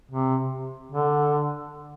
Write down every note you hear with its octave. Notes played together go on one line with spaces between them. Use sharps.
C3
D3